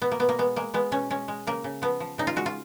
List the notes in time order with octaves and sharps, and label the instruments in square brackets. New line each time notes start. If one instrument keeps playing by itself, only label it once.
[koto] B2 B3
A#3
B2 B3
A#3
G#3 B3
G#3 A#3
G#3 B3
B2 C#4
G#3 C#4
G#3
C#3 A#3
C#3
F3 B3
F3
C#3 D#4
F4
G#3 F#4
F4